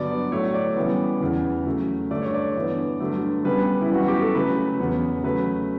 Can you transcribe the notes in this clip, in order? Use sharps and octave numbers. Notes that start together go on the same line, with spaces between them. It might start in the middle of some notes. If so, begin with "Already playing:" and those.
Already playing: G2 D3 F#3 B3 D5
A2 F#3 A3 C#5
D5
C#3 E3 G3 B3
E2 C#3 E3
C#3 F#3 A3
G2 D3 A3 D5
C#5
D5
G2 E3 B3
G2 D3 F#3 A3
C#3 G3 B3 B4
E4
F#2 E3 G3 B3 F#4
G4
A4
C#3 F#3 A3 B4
E2 C#3 F#3 B3
C#3 F#3 A3 B4